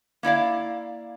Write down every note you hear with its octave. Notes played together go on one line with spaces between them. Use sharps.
A#3 E4 D5 F5